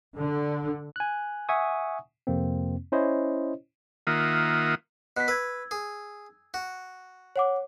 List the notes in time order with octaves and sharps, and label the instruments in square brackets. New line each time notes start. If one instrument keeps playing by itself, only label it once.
[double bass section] D3
[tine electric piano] G#5 F#6
E5 F#5 G#5 C#6 D#6
F2 C3 A#3 C4
C#4 E4 C5 C#5 D#5
[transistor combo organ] D#3 A#3 F4 E5 F#5 D#6
[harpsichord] B2 [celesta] F#6 B6
[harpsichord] B4 [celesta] E6 G#6
[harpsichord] G#4
F#4
[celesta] C#5 F#5 D6